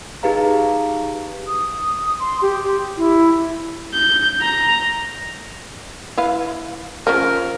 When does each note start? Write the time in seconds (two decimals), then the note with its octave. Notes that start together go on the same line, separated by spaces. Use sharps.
0.23 D#4 G4 G#4 B4 F5 A#5
1.47 D#6
2.20 C6
2.42 G4
2.97 E4
3.94 G6
4.41 A#5
6.17 E4 B4 F5
7.07 F3 C#4 A#4